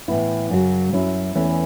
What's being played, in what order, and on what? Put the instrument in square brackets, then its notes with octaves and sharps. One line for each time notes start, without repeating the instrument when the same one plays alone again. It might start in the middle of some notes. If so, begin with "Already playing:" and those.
[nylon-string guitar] A2 E3 B3 E4
F#2 C#3 F#3
F#2 F#3 C#4 E4
E2 E3 A3 C#4